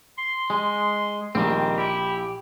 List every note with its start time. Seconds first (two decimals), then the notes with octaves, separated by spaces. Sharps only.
0.18 C6
0.50 G#3
1.35 A#1 D#3 G3 C4
1.78 E4 G4